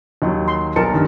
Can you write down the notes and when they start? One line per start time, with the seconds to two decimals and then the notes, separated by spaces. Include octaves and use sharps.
0.22 D#2 D#3 F#3
0.48 C6
0.76 B1 A#4 A5 C#7
0.94 G2 D#3